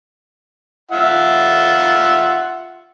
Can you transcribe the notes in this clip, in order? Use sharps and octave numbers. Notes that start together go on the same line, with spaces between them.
F4 E5 F#5